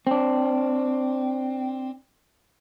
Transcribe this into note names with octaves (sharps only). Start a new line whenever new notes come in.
C4 D4